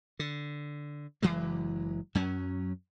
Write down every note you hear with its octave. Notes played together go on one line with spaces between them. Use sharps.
D3
F#1 E3 F#3 G#3
F#2 F#3 C#4